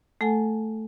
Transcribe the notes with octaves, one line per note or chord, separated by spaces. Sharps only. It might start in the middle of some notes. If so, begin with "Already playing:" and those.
A3 A4 F#5 G#5